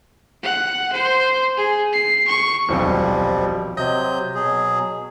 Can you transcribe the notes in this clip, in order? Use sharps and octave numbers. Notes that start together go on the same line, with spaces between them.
F#5
C5
G#4
C7
C#6
D#1 B1 F2 B2 F3 G3
C3 F#3 D#5 G6
B2 F#3 G#4